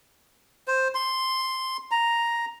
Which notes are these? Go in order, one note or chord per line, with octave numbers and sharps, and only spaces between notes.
C5
C6
A#5